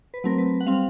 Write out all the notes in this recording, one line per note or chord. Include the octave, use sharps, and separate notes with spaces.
B4
F#3 A3 C4 A#4
B4
F#5
G3 C4 F5